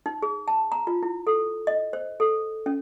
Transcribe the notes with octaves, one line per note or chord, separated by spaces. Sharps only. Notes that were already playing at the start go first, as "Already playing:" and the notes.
D#4
G#4
A5
A#5
F4
E4
A4
D#5
C5
A4
C#4